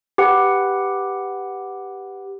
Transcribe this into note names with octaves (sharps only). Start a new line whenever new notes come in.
G4 B4 F#5